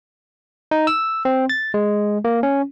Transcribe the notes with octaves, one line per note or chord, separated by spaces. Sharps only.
D#4
E6
C4
A6
G#3
A#3
C#4